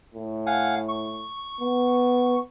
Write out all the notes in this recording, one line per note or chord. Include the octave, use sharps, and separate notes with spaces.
A2
F5 F#5 G#5
C#6
B3